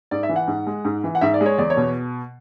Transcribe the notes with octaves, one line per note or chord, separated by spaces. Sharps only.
G#2 D5
E5
E3
F#5
G#2
G#3
G#2
E3
F#5
G#2 E5
D5
G#3
C#5
E2 D5
C#5
B2